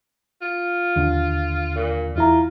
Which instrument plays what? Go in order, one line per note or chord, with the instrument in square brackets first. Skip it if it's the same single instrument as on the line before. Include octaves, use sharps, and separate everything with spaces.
[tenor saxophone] F4
[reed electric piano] D#2 D3
[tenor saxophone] A#2
[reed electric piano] E2 E4 A#5 [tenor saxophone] F4